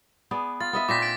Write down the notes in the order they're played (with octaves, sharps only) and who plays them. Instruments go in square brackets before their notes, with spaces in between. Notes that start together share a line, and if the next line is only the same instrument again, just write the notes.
[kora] B3 G#4 D5
[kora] F4 [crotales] A6
[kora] B3 D#5 E5
[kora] A#2 C4 D4 [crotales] D6 A#6 B6
[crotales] A6 D7